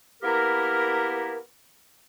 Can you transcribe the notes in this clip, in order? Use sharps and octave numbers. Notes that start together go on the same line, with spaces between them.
A#3 B3 E4 G4 A#4